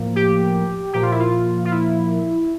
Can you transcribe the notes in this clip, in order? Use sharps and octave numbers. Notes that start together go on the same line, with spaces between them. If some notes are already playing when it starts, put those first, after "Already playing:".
Already playing: A2 F3 A#3
G4
A#2 F3 A#3 G4
F4
E4
F4
F4
E4